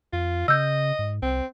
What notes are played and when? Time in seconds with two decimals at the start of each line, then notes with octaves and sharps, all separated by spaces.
0.13 F2 F4
0.48 C#3 D#5 E6 G6
0.99 G#2
1.22 C2 C4